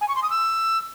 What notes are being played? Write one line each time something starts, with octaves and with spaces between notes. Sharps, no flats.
G#5
C#6
C6
D#6
E6